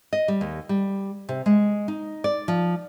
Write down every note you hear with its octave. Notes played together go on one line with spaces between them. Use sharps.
D#5
G3
D#2
G3
C3
G#3
D#4
D5
F3